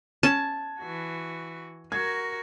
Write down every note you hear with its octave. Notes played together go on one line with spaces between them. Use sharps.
C#4 A5 G#6 D#7
E3 F#4
F#4 A#4 G#6